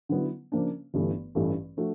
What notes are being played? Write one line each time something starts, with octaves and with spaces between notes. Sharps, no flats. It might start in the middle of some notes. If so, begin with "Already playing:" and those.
D3 F#3 B3 E4
C#3 F3 A#3 D4
G1 G2 E3 A3
A1 G2 E3 A3
F3 A3 D4 F#4